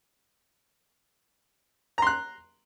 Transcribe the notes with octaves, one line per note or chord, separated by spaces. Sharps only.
A#5 C6 F#6